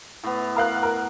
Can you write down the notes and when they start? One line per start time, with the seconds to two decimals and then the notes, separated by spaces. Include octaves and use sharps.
0.23 A2 B3
0.56 A#4 F5 F#6
0.83 A#4